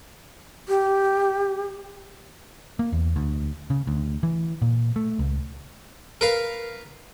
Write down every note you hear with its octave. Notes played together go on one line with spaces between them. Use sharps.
G4
A#3
E2
D2
C#3
D2
E3
A#2
A3
C#2
A#4 B4 F5